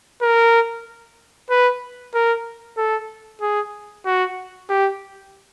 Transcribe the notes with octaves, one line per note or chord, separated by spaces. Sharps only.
A#4
B4
A#4
A4
G#4
F#4
G4